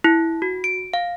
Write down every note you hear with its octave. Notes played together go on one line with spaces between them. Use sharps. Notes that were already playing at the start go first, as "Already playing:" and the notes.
E4
F#4
D7
F5